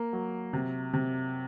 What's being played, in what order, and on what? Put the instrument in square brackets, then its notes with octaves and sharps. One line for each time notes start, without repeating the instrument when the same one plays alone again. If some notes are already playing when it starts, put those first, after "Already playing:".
Already playing: [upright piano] A#3
F#3
C3
C3